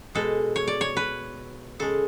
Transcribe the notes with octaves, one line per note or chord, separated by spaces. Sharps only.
B2 G#3 A4
C#5
D5
C#5
B4
C#3 G#3 A4